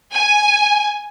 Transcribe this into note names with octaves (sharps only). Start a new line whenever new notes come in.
G#5